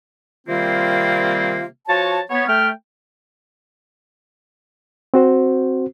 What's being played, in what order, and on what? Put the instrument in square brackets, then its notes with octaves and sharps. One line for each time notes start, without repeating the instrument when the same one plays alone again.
[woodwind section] C3 D#3 G3 A#3 C4 F4
F3 F#4 C#5 A5
B3 C#5
A3 G5 F6
[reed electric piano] C4 F#4 C5